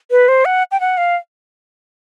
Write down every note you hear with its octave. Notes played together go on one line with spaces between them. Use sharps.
B4
C5
F#5
G5
F#5
F5